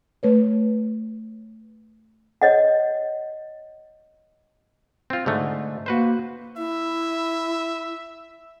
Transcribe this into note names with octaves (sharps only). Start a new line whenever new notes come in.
A3 B4 C#5
C#5 D#5 F#5
C4 F4
G#2 D3 A3
A#3 F#4 B4 C5
E4 E5